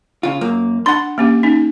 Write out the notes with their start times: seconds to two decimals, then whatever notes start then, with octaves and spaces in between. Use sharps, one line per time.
0.23 C#3 F4
0.41 F#2 A#3
0.86 D4 F#5 B5 C6
1.18 A#3 C#4 G4
1.43 C#4 D#4